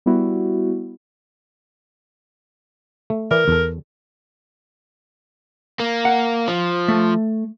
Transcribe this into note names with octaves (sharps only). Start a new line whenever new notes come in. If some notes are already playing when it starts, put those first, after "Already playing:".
G3 B3 E4 F#4
A3
E3 E4 A#4 D5
E2 A4
A#3
F#5
F3
A3